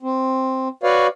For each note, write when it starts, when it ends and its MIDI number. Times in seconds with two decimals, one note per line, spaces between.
0.02 0.68 60
0.83 1.07 66
0.83 1.07 71
0.83 1.07 73
0.83 1.07 74
0.83 1.07 77